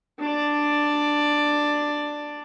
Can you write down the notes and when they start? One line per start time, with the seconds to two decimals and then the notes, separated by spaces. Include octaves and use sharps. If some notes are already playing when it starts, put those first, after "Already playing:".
0.19 D4 D5